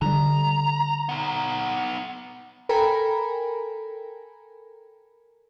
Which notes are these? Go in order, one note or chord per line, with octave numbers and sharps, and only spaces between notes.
D3 G3 A#5
B3 D#4
A4 A#4 G5 G#5 A#5 B5